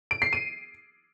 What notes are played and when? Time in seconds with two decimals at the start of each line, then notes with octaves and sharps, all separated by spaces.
0.11 D7
0.22 C7
0.33 D#7